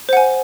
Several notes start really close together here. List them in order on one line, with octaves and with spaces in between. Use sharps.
C5 F#5 G#5